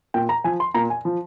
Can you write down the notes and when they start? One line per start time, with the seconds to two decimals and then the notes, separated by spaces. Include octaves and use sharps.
0.14 A#2 G5
0.29 A#5
0.44 F3 G#5
0.60 C6
0.74 A#2 A#5
0.90 G#5
1.05 F3